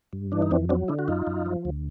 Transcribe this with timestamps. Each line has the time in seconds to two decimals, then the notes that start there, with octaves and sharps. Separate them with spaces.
0.13 G2
0.32 E3 D4
0.42 D#4
0.51 F2 C4 D4
0.69 F#3 C4 D4
0.88 D3 D4 E4
0.99 F#4
1.08 F#2 D#4 F4
1.27 F#2
1.46 F3
1.65 D2